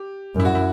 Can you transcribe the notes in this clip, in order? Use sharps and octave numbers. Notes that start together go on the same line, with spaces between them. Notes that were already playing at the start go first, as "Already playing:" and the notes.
Already playing: G4
F#2 E4
F#4
E4